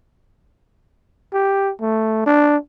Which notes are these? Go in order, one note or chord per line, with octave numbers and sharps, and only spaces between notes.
G4
A3
D4